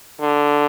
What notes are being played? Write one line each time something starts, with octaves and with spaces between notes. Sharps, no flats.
D3